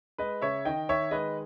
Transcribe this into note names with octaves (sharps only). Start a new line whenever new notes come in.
G#3 B4 D#5
C#3 C#5 E5
D#3 D#5 G5
D#3 C#5 E5
G#3 B4 D#5